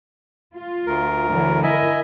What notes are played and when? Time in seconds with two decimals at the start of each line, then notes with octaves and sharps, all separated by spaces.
0.55 F4
0.87 D2 A#4
1.31 D3 E3 F#3
1.63 E4 A#4 D#5 E5 G#5